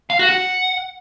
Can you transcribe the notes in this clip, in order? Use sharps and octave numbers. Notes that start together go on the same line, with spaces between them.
F5
F#4
F#5